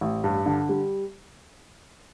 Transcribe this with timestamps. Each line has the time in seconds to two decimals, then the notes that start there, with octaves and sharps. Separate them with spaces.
0.01 A1
0.24 G2
0.46 D3
0.69 G3